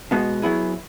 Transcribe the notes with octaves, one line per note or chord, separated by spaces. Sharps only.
B2 G#3 B3 F#4
F#3 B3 E4 G#4